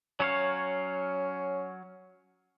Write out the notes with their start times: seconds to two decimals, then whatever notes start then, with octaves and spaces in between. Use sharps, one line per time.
0.20 F#3 C#4 C#5 F5